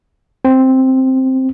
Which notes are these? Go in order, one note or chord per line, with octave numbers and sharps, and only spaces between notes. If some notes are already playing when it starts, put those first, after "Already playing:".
C4